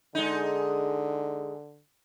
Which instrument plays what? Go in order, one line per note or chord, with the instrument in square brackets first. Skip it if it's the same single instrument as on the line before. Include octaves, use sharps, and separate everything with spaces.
[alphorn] D3 [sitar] G#3 D#4